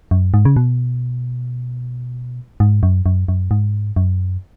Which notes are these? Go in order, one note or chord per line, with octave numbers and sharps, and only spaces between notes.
F#2
G#2
C#3
B2
G#2
F#2
F#2
F#2
G#2
F#2